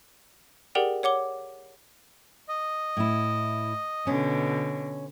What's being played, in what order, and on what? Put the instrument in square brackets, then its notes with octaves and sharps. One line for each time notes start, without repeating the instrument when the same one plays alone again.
[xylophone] G4 G#4 A#4 D5 F#5 G5
C#5 F#5 D6 G7
[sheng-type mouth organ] D#5
[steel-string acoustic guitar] A2 E4
[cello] B2 D3 [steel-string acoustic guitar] C#4